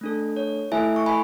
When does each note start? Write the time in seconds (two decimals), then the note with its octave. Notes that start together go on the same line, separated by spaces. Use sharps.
0.01 A3 D4 A4
0.37 C#5
0.72 A3 E4 A4 E5 G#5
0.96 C#6
1.06 G#5 B5